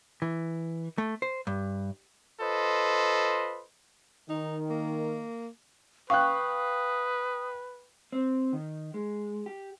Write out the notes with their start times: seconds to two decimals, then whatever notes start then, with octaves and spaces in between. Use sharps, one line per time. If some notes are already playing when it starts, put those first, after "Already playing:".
0.22 E3
0.98 A3
1.22 C5
1.47 G2
2.41 F4 A4 B4 C5 D#5
4.29 D#3 D#4
4.69 A#3
6.10 B4 F5 G5 C#6 D#6 F#6
8.12 C4
8.53 D#3
8.94 G#3
9.46 G4